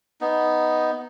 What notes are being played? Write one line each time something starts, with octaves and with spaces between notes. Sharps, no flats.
B3 D#4